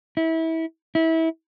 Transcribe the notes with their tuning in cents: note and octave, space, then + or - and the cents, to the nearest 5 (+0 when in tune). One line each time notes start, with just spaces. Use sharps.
E4 -25
E4 -25